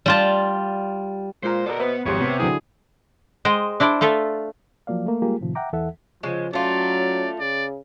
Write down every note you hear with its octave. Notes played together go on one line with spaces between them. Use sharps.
G3 F4 A5
A#2 G#3 F4 C5 A#5
B2 A4 A#4 D5
B3 B4 C5 E5
G#1 F2 G4 C#5 C6
C3 B3
D3 F#3 E4 G#4
G#3 C5 D#5 G5
D4 E4 C5 D5
A3 F4 A4 E5
F3 F#3 A#3 D5 F5
A3 A#3
G3 G#3 A#3 F4 G4 G#4
A2 C3 D#3 F3
E5 F#5 G5 A#5 D6
E2 E3 A4 E5 F#5
C#3 F3 G#3
F#3 A3 C#4 F4 D5
C#3 D5